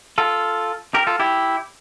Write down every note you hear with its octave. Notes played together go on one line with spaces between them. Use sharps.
F4 A4
G4 A#4
F4 A4
E4 G4